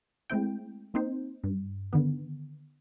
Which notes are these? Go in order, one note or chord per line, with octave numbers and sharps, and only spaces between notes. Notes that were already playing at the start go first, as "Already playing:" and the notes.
G#3 A3 C4 E4 G5
A#3 C4 D#4 C5
G2
D3 D#3 B3